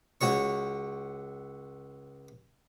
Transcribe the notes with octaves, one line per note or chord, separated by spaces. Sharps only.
C#2 F#4 C#5 C#6